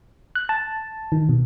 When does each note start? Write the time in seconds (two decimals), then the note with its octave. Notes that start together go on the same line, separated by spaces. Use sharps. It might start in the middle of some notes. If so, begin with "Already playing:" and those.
0.35 F#6
0.49 A5
1.12 D#3
1.29 B2